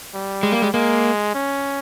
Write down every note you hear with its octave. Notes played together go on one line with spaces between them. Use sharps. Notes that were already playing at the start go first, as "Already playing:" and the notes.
G3
G#3
A#3
G#3
G#3 A#3
C#4